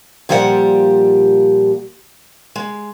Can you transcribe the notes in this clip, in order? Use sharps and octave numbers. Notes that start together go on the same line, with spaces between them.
A#2 F3 G3 G4 A4 F#5
G#3